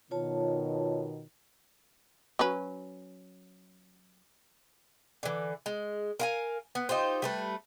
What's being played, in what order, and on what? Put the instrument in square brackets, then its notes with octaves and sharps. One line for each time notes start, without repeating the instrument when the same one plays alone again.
[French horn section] B2 D#3 [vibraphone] F4 C#5 A5
[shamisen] F#3 C#4 B4
[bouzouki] D3 E3
G#3
A#4 F5 G#5
B3
D#4 F4 G4 C5
G3 A3 B4